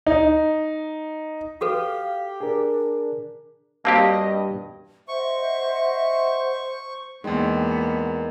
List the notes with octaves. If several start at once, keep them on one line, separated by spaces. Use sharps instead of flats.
D#4
F#4 G4 A4 B4 F5
D4 G#4 A#4
G2 A#3 C4 F#4 G4 D#5 F5 A5
C5 D#5 E5 F#5 C#6
E2 D#3 G#3 A#3 B3 C6